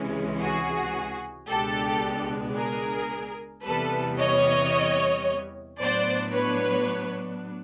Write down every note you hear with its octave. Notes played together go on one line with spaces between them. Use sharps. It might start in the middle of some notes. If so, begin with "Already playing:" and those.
Already playing: C#2 C3 E3 G#3 C#4
F#4 G#4
C#2 B2 G#3 B3 D4 G4 A4
G#4 A#4
E2 C3 E3 G3 B3 A4 B4
C#5 D#5
A2 F#3 B3 D4 C5 D5
B4 C#5